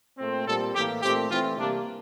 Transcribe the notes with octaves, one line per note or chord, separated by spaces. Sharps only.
A#2 A3 C4
A#2 G3 C4 A4
A2 E3 A#3 G4
A#2 A3 C4 G4
E3 A3 C4 F4
C3 G3 A#3 D4